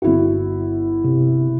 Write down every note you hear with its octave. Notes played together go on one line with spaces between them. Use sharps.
G1 E4 F#4
C3